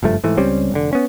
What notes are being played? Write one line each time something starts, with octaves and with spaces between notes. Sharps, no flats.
F#1 G2 F3 A3
G#2 E3 A3
C#2 G3 C4 C#4
F1 D3
B3 C#4